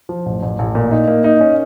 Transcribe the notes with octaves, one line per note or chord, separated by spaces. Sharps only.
F3
A1
A1
A1
A#2
D#4
A#3
D#4
C#4